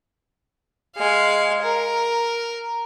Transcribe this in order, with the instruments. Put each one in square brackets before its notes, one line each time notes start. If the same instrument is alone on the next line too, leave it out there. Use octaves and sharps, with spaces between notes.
[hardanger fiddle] G#3 F5
A#4